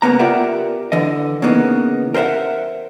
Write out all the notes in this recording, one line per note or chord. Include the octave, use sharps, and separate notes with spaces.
C2 C#3 A#3 B3 A#5
F4 G4 A#4 D5 E5 F#5
D3 E3 D#5
C#3 E3 A#3 B3 D#4
A#4 C5 D#5 E5 F#5